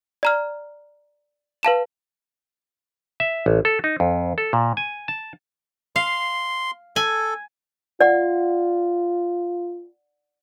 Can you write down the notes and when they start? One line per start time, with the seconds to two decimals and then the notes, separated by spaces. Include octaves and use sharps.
0.23 D5 A#5 F6
1.63 B4 F5 A5 E7
3.20 E5
3.46 A1
3.65 A4
3.84 D#4
4.00 F2
4.38 A4
4.53 A#2
4.77 G#5
5.08 A5
5.96 F5 C6
6.96 A4 G#5
8.01 F4 D5 F#5